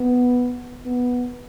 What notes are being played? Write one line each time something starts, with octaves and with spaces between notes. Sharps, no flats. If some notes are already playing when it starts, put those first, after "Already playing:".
Already playing: B3
B3